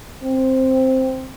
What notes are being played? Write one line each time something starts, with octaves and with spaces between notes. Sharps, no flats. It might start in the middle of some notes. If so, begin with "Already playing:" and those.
C4